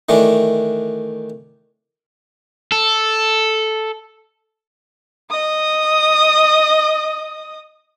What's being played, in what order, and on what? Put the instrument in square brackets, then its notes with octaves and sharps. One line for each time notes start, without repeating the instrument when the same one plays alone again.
[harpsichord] D#3 E3 A3 D4
[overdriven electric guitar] A4
[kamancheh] D#5 D#6